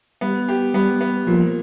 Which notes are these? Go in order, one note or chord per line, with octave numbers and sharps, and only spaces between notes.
G3 B3
G4
G3 B3
B3
A#2 F3